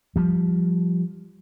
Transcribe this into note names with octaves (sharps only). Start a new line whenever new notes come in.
F3 G3